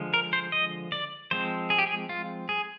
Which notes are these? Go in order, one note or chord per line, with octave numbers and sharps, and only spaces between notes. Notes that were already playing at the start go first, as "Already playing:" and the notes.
Already playing: D3 F3 G#3
A#4
C5
D#5
D5
F3 G#3 C4 C5
G#4
G4
G#4
F4
G#4